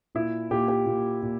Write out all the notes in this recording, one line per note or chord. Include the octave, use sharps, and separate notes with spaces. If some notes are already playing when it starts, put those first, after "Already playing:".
A#2 E4
A#2 G4
G4
A#2
A#2